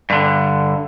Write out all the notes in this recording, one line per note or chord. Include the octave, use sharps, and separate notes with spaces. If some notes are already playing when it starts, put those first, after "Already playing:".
G2 D3